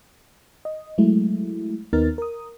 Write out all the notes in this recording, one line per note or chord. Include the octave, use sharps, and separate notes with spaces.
D#5
F#3 G#3 A3 E4
D#2 B3 D#4 A#4 F6 A6
A#4 D#6